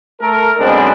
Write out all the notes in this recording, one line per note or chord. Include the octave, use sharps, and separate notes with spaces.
A3 A4 A#4
F#2 B2 G#3 C4 D4